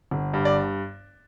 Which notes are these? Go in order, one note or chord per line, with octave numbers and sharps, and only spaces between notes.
G1
G2
D5